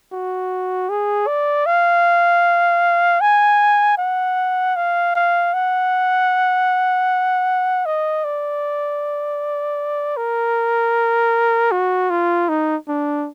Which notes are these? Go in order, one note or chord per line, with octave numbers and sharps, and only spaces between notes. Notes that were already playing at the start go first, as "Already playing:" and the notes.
F#4
G#4
D5
F5
G#5
F#5
F5
F5
F#5
D#5
D5
A#4
F#4
F4
D#4
D4